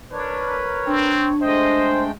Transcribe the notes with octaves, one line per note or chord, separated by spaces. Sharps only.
D4 A#4 B4 C#5
C4 D4
G#3 A3 C5 D#5 G5